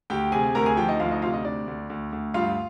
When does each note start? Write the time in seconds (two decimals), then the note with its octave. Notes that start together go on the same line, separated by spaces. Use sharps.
0.10 D2 G4 G5
0.32 C3 G#4 G#5
0.55 D2 A#4 A#5
0.66 G#4 G#5
0.77 F3 G4 G5
0.89 D#4 D#5
1.00 D2 F4 F5
1.11 D#4 D#5
1.22 C3 F4 F5
1.33 D#4 D#5
1.45 D2 D4 D5
1.68 D2
1.90 D2
2.12 D2
2.34 G2 F4 F5